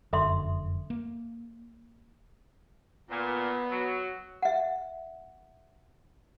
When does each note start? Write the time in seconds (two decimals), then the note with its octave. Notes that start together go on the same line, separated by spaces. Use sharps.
0.13 F1 F#2 D3 A4 E5 C6
0.90 A#3
3.10 A#2 B3
3.71 F#3
4.42 E5 F#5